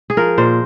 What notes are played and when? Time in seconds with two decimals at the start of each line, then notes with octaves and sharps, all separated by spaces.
0.10 G#4
0.17 F3 A#4
0.38 A#2 C5